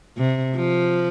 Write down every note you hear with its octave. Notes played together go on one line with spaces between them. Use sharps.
C3
F3